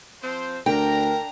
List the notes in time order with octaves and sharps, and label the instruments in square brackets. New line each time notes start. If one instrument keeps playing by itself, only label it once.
[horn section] F3 C4 C5
[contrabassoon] D2 [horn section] D4 A#5 [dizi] A#4 [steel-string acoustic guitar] G5